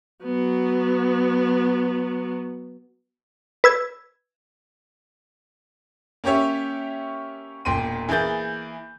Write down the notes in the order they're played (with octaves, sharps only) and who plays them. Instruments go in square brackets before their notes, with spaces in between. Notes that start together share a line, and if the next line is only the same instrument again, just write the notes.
[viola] F#3 B3
[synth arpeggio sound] B4 E6 G#6
[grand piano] A#3 C#4 G4 C#5 E5
E1 A#2 G5 C6 D#7
E3 A#3 G#4 G6 A6